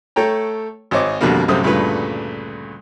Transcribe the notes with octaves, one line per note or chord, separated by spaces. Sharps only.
A3 A4 C#5 G5 A#5
G#1 C4 C#5 D#5 D6
B1 F2 B2 D3 G3 A#3
A#1 F#2 C3 A3 C4 D#6
D2 G2 A#2 C#3 A3 B4